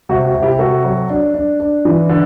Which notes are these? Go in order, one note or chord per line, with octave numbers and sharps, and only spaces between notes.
C3 F#4
F#4
C3
E4 G4
C3 F#4 A4
F#3
D4
D4
D4
E3
D3